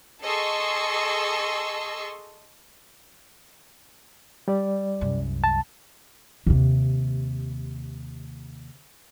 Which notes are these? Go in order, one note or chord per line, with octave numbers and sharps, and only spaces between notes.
G#4 A4 D#5 C6 C#6 E6
G3 D5
C2 F#2
A5
D#2 C3